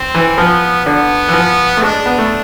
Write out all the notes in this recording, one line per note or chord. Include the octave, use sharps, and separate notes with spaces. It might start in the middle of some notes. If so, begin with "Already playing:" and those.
Already playing: C4
E3
F3 B3
D3 B3
E3
F3
A3
G#3 D4
B3
A3